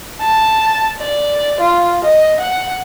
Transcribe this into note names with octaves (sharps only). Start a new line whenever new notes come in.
A5
D5
F4
D#5
F#5